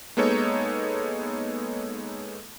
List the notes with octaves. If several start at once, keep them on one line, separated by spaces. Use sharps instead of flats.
G#3 A#3 B3 D#4 A4 C#5